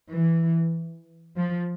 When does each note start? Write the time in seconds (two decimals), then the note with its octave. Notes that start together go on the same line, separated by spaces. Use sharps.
0.14 E3
1.37 F3